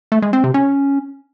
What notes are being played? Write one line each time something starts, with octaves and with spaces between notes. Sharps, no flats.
A3
G#3
C4
C3
C#4